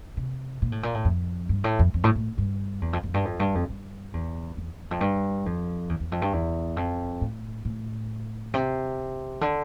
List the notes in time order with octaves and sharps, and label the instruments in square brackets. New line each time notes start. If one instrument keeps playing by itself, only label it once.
[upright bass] C3
A#2
A2
A#2
A2
F2
G2
A2
F2
F2
A2
A2
G2
E2
F2
F2
G2
F2
G2
F2
G2
E2
E2
E2
F2
G2
F2
E2
E2
F2
G2
E2
F2
A2
A2
C3
D3